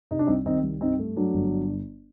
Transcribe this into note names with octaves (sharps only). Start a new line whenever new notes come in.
C3 D#4
D4
C2 C4 D#4
D#3 C4 D#4
C2
G2 C4 D#4
A3
F#3 D4
G1